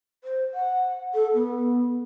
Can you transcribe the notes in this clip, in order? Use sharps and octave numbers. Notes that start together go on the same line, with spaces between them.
C5
F#5
A4
B3